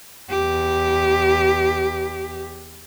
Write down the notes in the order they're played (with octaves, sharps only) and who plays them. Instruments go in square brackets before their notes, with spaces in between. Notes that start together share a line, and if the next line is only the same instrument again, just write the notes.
[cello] E2 G4